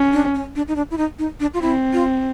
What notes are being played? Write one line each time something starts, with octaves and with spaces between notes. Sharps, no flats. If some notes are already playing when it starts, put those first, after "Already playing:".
Already playing: C#4
D4
C#4
D4
D#4
D4
E4
D#4
D#4
D4
F4
C4 E4
F4